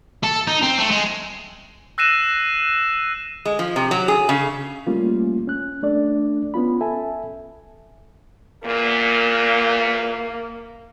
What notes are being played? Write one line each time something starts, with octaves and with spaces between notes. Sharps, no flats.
A4
D#4
C4
A3
G#3
E6 F#6 A#6 C7 D#7 E7
G#3
F3
C3
F#3
G#4
C#3
G3 A3 A#3 C#4 F4
C#4 F#6
A3 D4 A4 D5
B3 C#4 F4 B5
A4 E5 G#5 A5
E2 A#2 A#3